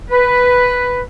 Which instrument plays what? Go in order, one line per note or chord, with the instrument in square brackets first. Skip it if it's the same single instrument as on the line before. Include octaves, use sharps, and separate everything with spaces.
[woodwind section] B4